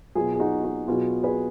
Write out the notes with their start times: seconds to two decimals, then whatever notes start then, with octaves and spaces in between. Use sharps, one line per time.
0.15 B2 F#3 F4 G#4
0.34 G#4
0.40 D#4 F#4
0.63 D#4 F#4
0.87 B2 F#3 F4 G#4
1.24 G#4 B4